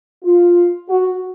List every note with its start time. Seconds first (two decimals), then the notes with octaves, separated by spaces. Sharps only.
0.23 F4
0.88 F#4